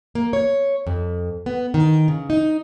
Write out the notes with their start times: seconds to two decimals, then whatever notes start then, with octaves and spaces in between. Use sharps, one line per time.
0.15 A#3
0.33 C#5
0.87 F2
1.46 B3
1.74 D#3
2.08 C#3
2.30 D#4